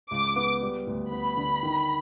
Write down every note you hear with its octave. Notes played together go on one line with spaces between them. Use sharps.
C#2 D6
B3
G3
D2
B3 B5
D3
D#3